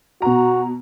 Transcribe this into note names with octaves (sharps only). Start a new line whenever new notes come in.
B2 F#4 A#5